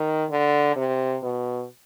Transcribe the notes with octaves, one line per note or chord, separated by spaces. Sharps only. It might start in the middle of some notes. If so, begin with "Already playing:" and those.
Already playing: D#3
D3
C3
B2